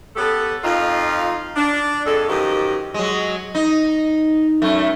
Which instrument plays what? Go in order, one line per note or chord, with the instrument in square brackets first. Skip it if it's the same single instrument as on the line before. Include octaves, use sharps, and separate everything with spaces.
[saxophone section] B3 C#4 G4 A4
F2 D#4 F4
D4
F2 G#3 A4
F#2 D#3 F3 G4 D#5
[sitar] F#3 G#3
D#4
F#2 A3